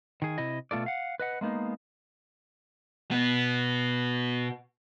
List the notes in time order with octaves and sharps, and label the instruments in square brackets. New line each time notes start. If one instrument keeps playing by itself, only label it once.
[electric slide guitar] D#3 G#4
C3 E4 D#5
B2 A3 F4 A4 D5
F5 F#5
B4 D#5 F#5
G#3 A#3 B3 D#4
[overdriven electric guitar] B2 B3